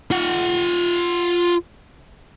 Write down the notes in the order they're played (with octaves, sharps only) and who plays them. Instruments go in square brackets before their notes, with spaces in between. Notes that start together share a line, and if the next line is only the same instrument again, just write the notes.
[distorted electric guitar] F4 F#5